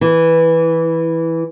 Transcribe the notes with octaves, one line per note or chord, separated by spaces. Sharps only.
E3